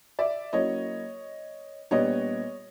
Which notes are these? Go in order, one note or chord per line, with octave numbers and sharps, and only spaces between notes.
D5 E5
F#3 A#3 C#4 E4 C#5 D#5
A#2 G3 B3 D4 C#5 D#5